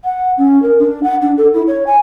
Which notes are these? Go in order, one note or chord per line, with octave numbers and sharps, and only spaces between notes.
F#5
C#4
A#4
D4
F#5
D4
A4
E4
C#5
G#5